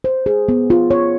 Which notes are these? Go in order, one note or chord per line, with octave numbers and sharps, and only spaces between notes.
C5
G#4
B3
F4
C#5